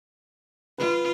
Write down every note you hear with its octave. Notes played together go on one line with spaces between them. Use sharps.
F4 B4